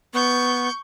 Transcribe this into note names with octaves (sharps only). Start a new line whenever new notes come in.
B3 C#6 G6